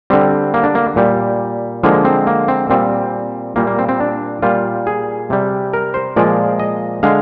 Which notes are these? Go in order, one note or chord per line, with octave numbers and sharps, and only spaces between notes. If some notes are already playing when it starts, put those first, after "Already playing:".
D3 G3 C4
A#3
D4
A#3
A#2 G3
D3 F3 G#3 A#3
C4
A#3
C4
A#2 G3 C4
A#2 G3 A#3
A#3
C4
C4
D4
A#2 G3 F4
G#4
C3 G3
A#4
C5
A#2 F3 G#3 D5
D#5
D3 G#3 F5